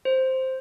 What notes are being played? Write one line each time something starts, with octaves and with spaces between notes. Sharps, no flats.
C5